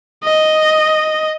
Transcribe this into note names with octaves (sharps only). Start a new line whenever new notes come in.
D#5